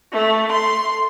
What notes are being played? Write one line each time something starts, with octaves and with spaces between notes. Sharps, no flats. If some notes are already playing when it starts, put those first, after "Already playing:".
A3
C6